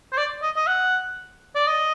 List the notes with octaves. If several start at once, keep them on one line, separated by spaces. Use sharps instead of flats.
C5
D5
D#5
D#5
F#5
D5
D#5